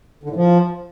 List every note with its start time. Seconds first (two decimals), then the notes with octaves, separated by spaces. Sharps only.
0.23 D3
0.30 A2
0.36 F3